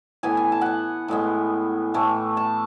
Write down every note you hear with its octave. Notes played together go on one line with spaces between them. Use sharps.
A2 E3 B3 G#5
G#5
A5
F#5 G#5
A2 G#3 B3
A2 E3 A3
A5